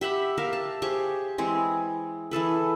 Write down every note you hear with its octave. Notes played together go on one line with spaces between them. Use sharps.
G4 E5 F#5 B5
G4 A#4 E5 F5
A5
G4 G#4 C5 C#6
E3 G#3 C4 G#4
E3 G#4 A4 B4